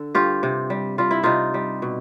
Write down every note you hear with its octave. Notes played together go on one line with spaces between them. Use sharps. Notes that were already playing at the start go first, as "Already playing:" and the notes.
Already playing: D3 A4
G2 F4 G4
C3
G3
G3 F4
E4
C3 D#4 F4
G3
B2